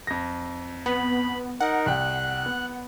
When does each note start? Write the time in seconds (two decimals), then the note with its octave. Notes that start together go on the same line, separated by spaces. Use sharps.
0.07 F2 A#6
0.86 B3 B5
1.61 D#4 A#4 F#5
1.86 C2 G5 F#6
2.46 B3